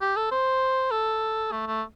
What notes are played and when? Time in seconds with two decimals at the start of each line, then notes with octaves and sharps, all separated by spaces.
0.01 G4
0.16 A4
0.32 C5
0.91 A4
1.52 A3
1.67 A3